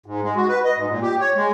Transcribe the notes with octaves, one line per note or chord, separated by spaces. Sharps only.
G#2
G#3
F#4
B4
D#5
G#2
A#2
G4
C#5
G#3